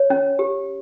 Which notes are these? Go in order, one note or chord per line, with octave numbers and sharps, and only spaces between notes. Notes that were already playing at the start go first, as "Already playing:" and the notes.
Already playing: C#5
C#4
G4